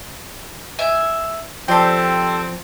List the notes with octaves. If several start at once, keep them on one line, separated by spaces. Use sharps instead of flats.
E5 G#5
F3 C4 G4 A4 D5 G5 C6